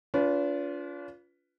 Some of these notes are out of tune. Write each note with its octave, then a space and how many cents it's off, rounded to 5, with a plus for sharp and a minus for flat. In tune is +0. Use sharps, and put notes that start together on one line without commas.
D4 -45 F4 +0 B4 +5